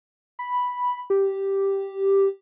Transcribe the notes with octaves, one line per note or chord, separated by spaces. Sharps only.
B5
G4